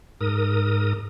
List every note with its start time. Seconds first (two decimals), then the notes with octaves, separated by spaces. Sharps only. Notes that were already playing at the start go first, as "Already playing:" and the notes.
0.21 G#2 A#4 D#6